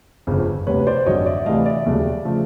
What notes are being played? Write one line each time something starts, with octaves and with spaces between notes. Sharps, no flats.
G1 F2 C#3
E1 D2 C3 B4 C#5
C5 D5
G#1 F#2 D3 C#5 D#5
D5 E5
D2 C3 E3 A3 D#5 F5
D5 E5
E1 D#2 C#3 F#3 A3
C#3 F3 A3